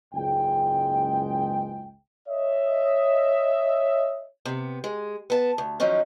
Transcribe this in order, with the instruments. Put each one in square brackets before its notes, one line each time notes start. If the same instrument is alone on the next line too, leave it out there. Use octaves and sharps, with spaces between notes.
[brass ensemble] F#1 C#2 G#2 G#3 G5
C#5 D#5 E5
[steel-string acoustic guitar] C3 B3
G#3
B3 A5
D2
D#3 F3 F#3 C#4 D#4